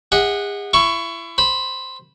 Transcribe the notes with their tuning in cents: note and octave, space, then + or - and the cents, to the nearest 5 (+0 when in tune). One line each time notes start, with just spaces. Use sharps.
G#4 -40 D#5 +45 F#5 -5
E4 +30 C#6 +0
C5 +0 B5 -5